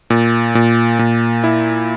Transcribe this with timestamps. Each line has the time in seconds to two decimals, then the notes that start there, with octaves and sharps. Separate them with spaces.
0.10 A#2
0.55 A#2
0.99 A#2
1.44 E4